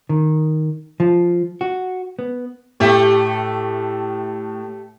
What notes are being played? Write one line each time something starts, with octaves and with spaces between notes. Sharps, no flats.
D#3
F3
F#4
B3
A2 A3 G4 E5